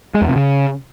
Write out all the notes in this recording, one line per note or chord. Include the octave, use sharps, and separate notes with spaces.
G#3
E2
C3
C#3